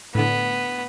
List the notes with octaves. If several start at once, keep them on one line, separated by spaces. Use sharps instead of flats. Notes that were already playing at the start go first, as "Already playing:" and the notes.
A2 D3 B3